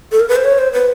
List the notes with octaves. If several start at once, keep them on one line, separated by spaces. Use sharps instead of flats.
A4
A#4
B4
C5
C#5
C5
B4